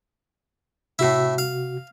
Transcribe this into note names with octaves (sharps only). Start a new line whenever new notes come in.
A2 C3 E4 F#4
F5